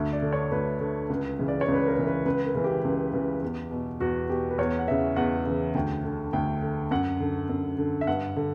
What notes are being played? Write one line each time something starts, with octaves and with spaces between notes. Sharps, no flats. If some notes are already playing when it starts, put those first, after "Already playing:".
Already playing: D2 E5
D5
D3
C#5
D2 B4
D3
C#2
C#3 E3
D5
C#5
C#2
B4
A#4
C#3 E3
B4
C#2 B4
A#4
C#3 E3
G4
C#2
C#3 E3
E2
B2
E2 F#4
B2 G4
B4
E2 C#5
F#5
C#3 E3 E5
E2 F#5
C#3 E3
D2 G5
D3
D2 G5
D3
F#2 F#5
D3
F#2
D3
E5
G2 F#5
D3